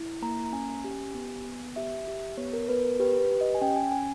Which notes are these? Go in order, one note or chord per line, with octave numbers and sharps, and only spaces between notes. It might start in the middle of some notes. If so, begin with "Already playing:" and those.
Already playing: E4
A#3 A#5
A#5
C#4 G#5
G4
B3
B3
G4 E5
G4
B3 C#5
A#4
B3 B4
A#4
G4 B4
B4
G4
D#5
G#5
C#4 G5
G#5
C#4 G#5